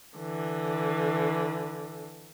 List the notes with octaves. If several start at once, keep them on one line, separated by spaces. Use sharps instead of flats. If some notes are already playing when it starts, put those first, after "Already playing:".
D3 E3